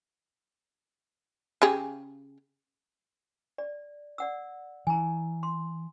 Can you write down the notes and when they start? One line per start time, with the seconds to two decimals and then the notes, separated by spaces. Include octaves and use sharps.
1.62 C#3 G4 G#4
3.58 D5
4.18 D5 F#5 E6
4.87 E3 G#5 A#5
5.43 C6